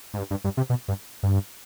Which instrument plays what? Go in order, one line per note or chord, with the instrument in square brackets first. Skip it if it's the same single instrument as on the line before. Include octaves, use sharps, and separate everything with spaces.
[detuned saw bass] G#2
G2
G2
G2
C3
B2
G2
G2